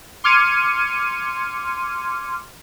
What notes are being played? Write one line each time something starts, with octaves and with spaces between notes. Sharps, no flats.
C6 D6 F6 G#6 C#7 D#7